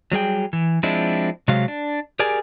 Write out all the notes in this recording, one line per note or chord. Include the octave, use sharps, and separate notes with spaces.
F#3 G3 G#4 G5
E3
F3 G#3 C4 D4 E4
C3 F#3 G#3 F5
D4
G4 G#4 A#4 D5 G#5